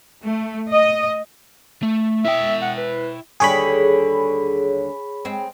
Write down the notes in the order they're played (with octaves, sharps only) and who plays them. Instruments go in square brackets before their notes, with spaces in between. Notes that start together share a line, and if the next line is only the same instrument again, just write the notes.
[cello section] A3
D#5
[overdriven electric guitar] A3
[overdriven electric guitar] E4 G5 [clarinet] E5
[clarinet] F#5
B4
[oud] D#2 D3 G3 [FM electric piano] G#4 C#5 B5
[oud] G#3 C4